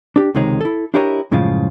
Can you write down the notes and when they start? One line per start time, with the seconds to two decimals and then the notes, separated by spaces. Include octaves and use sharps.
0.16 D4 G4
0.35 C#2 C3 D#3 G#3 D#4 C#5
0.61 E4 A4
0.94 D4 E4 G4 A#4 C#5 D#5
1.31 F#2 A2 C#3 F3 G#3 F4